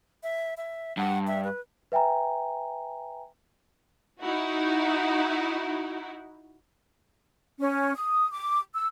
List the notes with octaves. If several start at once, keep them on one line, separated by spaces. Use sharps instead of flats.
E5
E5
G2 F#5
E5
B4
B4 E5 G5 G#5 A#5
D#4 E4 F#4
C#4
D#6
D6
E6